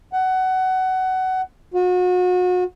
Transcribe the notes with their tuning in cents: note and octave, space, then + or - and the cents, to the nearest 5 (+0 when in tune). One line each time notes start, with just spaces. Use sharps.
F#5 +20
F#4 -35